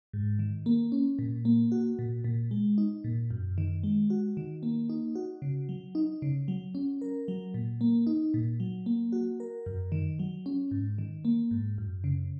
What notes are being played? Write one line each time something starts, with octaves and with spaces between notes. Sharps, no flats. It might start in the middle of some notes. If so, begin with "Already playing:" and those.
G#2
D#3
A#3
C#4
A#2
A#3
F#4
A#2
A#2
G#3
D#4
A#2
F#2
D#3
G#3
F#4
D#3
A#3
D#4
F#4
C#3
F#3
D#4
C#3
F#3
C#4
A#4
F#3
A#2
A#3
D#4
A#2
F#3
A#3
F#4
A#4
F#2
D#3
F#3
C#4
G#2
D#3
A#3
G#2
F#2
C#3